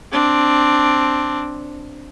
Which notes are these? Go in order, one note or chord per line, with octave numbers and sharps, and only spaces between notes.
C4 D4